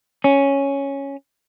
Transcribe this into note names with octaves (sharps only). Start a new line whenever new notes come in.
C#4